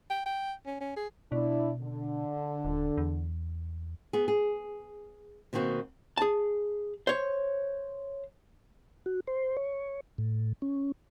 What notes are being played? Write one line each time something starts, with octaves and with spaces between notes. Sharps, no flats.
G5
G5
C#4
C#4
G#4
B2 D4 E4 D5
D3
D#1
E2
B3 G#4
G#4
B2 D#3 A#3 C4 F#4
G#4 A5
C5 C#5
F#4
C5
C#5
A2
C#4